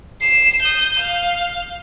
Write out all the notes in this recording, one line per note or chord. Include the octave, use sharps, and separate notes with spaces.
C7 E7
D#6 G6
F5